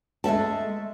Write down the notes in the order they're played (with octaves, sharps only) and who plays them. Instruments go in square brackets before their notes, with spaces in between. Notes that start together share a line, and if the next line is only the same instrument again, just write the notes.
[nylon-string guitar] G#3 A3 E5 A5